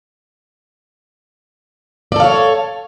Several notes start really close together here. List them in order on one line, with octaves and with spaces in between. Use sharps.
D5 A4 F5 C#5